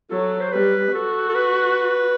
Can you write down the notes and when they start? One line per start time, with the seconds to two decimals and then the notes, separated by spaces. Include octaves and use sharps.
0.11 F#3 A4
0.41 C5
0.52 G3 B4
0.93 F#4 A4
1.29 A4
1.35 B4